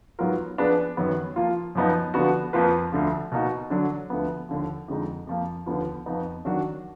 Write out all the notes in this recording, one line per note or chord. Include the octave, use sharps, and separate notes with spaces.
G#2 F#3 B3 F4 A#4
F3 B3 D4 G#4 B4
F#2 D#3 F#3 B3
F3 A#3 F4
F#2 F3 B3 D#4
D3 F3 B3 D4 F#4
F2 F3 A#3 F4 B4
D2 D3 F3
B2 A#3 D#4 F#4
D3 F#3 D4
D2 D3 F3 B3
D#2 D3 F3
F2 D3 G#3 D#4
F2 F3 A#3
D#2 D3 F3 B3 F4
F2 F3 B3 D#4
D#3 F#3 D4 F#4 A#4